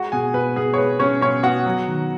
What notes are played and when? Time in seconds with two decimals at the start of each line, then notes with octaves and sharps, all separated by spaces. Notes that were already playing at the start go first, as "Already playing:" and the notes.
Already playing: G#3 F#4 F#5
0.12 B2 G#4 G#5
0.34 B2 B4
0.56 B3 G#4
0.74 C#5
0.78 G#3 B4
0.99 B2 C#4 C#5
1.21 B2 C#4 C#5
1.43 B3 F#4 F#5
1.66 F#3
1.87 D#3